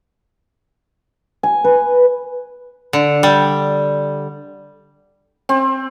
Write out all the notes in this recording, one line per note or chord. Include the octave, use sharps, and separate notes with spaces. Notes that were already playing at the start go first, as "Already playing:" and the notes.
G#5
B4
D3
G3
C4